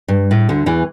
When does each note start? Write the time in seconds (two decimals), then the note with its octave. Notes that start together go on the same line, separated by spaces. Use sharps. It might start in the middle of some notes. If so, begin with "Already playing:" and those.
0.08 G2
0.31 A2
0.49 D2 D3
0.66 E2 E3